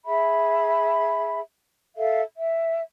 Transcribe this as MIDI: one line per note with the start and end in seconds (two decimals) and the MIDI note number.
0.04 1.38 68
0.04 1.38 76
0.04 1.38 83
1.95 2.20 69
1.95 2.20 76
1.95 2.20 77
2.36 2.80 76